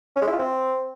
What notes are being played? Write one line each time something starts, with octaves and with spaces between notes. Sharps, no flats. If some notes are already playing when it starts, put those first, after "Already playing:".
C#4
G#3
E4
F4
C4